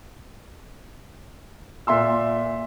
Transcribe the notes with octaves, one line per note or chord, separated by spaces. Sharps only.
A#2 E5 C6 E6